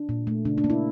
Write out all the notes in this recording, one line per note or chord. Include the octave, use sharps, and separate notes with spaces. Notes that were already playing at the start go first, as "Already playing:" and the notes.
Already playing: D4
A#2
A3
C#3 D4
D4
A#3
E4